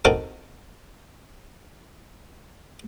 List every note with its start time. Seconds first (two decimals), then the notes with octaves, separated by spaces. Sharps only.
0.05 C4 D#4 F#4 A4 A#4